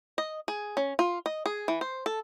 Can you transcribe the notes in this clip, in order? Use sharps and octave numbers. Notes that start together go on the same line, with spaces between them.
D#5
G#4
C#4
F4
D#5
G#4
E3
C5
A4